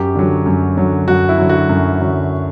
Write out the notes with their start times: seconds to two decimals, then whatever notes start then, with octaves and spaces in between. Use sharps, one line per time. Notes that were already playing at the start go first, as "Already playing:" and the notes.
Already playing: F#2 G4
0.15 D3 F#3
0.46 F#2
0.77 D3 F#3
1.08 F#2 F#4
1.29 E4
1.38 D3 F#3
1.49 F#4
1.69 F#2
2.01 D3 F#3